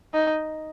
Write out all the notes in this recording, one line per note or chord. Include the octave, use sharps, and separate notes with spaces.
D#4